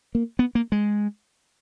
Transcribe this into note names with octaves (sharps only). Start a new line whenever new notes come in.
A#3
B3
A#3
G#3